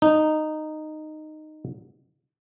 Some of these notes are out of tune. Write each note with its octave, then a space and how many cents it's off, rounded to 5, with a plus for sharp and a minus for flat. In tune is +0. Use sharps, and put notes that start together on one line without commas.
D#4 -10